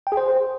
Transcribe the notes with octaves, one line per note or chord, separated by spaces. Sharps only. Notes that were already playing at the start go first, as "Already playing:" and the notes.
G5
G#4
C5